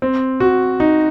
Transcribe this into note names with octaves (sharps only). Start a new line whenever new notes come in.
C4
F#4
D#4